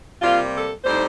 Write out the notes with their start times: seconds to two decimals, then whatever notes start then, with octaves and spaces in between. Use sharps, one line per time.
0.22 C3 G3 A#3 F4
0.54 A4
0.84 A2 G3 C4 D#4 C5